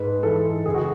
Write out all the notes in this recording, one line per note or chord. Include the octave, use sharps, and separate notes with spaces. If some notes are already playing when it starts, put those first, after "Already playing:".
Already playing: G#2 B4
E3 A4
C#2 G#4
F#4